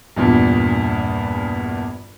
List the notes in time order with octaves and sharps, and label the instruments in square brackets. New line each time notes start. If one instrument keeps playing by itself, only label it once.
[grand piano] A#1 E2 G2 A#2